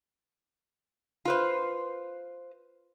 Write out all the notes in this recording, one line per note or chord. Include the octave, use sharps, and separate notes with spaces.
F4 B4 C5